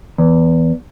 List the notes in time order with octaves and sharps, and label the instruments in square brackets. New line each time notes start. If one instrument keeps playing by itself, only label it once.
[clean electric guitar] E2